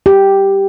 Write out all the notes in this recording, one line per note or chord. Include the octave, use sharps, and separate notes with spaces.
G4